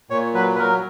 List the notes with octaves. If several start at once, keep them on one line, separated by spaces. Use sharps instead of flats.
A#2 C#5
F#3 B4
B4
F#3 A#4